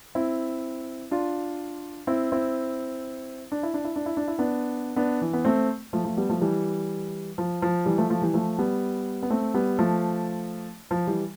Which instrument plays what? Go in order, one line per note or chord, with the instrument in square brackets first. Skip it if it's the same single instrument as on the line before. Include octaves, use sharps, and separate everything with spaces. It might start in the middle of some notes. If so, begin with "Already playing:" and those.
[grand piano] C4 E4
D4 F4
C4 E4
C4 E4
D4
E4
D4
E4
D4
E4
D4
E4
B3 D4
B3 D4
E3
B3
A3 C4
F3 A3
F3 A3
G3 B3
F3 A3
E3 G3
F3
F3
E3 G3
F3 A3
F3 A3
E3 G3
F3 A3
G3 B3
B3
A3 C4
G3 B3
F3 A3
F3
E3 G3